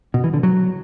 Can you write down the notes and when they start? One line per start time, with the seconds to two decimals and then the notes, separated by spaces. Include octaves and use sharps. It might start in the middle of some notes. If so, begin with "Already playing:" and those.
0.14 B2
0.24 E3
0.34 D3
0.43 F#3